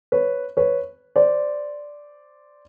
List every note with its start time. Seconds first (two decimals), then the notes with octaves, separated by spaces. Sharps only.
0.12 B4 C#5
0.57 B4 C#5
1.16 C5 D5